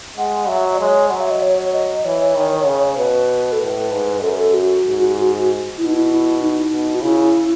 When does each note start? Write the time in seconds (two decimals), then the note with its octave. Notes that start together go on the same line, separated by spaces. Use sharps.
0.17 G#3 F#5
0.48 F#3 E5
0.79 G#3 C#5
1.09 F#3 F#5
1.21 E5
1.31 D#5
1.42 C#5
1.58 C#5
1.73 D#5
2.04 E3 C#5
2.36 D#3
2.66 C#3
2.93 C#5
2.98 B2 B4
3.52 A4
3.60 A2 B4
3.92 G#2
4.22 F#2 A4
4.29 B4
4.38 A4
4.54 F#4
4.84 G#2
5.78 B2 E4
5.86 D#4
5.93 E4
6.41 D#4
6.72 B2
6.95 F#4
7.02 C#3 E4